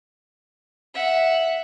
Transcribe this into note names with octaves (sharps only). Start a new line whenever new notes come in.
E5 F#5